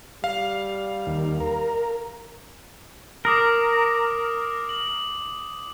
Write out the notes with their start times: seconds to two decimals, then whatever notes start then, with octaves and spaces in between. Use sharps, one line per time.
0.24 G3 F5
1.07 D#2
1.40 A#4
3.25 A#4 D6 D#6 C7
4.69 F#7